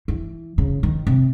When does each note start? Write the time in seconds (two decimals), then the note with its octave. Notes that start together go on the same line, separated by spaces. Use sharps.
0.08 E3
0.58 C#3
0.83 D#3
1.07 C3